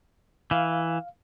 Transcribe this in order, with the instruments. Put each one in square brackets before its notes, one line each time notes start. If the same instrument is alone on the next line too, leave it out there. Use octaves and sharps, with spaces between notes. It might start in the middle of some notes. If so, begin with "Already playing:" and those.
[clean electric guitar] E3 [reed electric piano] F5